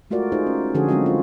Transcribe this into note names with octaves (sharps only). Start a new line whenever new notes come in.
G#3 A3 F4 F#4 A#4 D5
D#4 F4 G#4 C5
C#4
D3 F3 C#4 F#4 G#4 A4
F#3 G#3 C4 F4 F#4 D#5
F4